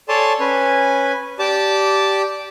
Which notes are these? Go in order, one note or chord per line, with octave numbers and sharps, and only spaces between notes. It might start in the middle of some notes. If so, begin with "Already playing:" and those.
A4 C#5 D5 G#5 A5 C6
C#4 B4 G#5
G4 D5 A5 D6